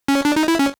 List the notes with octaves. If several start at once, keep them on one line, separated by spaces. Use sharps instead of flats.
C#4
D4
D#4
E4
C#4